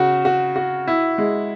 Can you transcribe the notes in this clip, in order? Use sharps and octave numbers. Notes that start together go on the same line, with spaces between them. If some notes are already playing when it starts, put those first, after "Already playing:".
Already playing: C#3 F#4
F#4
F#4
E4
G#3